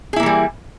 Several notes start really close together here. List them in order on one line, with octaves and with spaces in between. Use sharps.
G#4 E4 A#3 E3 G3